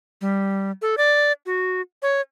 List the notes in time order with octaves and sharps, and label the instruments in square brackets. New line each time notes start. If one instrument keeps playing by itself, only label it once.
[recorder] G3
A4
D5
F#4
C#5